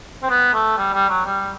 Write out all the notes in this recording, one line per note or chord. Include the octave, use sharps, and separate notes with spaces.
C4
B3
A3
G3
G3
F#3
G3